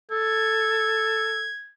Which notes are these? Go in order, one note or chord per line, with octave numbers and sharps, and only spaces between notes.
A4 G#6